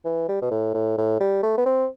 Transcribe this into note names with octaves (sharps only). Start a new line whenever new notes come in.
E3
G3
B2
A2
A2
A2
G3
A3
B3
C4